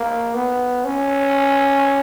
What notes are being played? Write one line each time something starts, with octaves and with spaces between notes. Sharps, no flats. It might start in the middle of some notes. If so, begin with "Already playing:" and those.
Already playing: A#3
B3
C#4